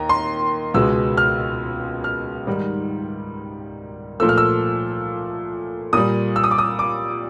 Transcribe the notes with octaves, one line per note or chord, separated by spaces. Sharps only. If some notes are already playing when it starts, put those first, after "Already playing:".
Already playing: D#2 A#5
C6
C#2 B2 G#3 E6
F6
F6
G#2 D#3 G3
A#2 F3 A3 E6
F6
E6
A#2 G3 D#6
E6
D#6
D6
D#6
D6